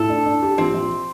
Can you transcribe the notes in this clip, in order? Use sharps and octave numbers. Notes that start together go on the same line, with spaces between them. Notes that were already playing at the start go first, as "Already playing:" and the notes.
Already playing: A2 A4
D4
D4
G4
A#1 C4
A#1